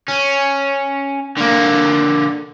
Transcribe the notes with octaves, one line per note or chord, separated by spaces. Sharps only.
C#4
D3 A#3